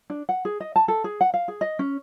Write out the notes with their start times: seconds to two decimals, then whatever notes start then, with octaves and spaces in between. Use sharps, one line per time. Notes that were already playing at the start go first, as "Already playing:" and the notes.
0.10 D4
0.29 F#5
0.45 G#4
0.60 D#5
0.76 A5
0.88 A4
1.04 G#4
1.21 F#5
1.34 F5
1.48 G#4
1.61 D#5
1.79 C#4